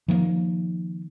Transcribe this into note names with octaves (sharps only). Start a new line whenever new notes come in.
D#3 F3 A#3